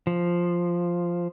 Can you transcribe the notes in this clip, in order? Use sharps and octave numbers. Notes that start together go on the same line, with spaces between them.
F3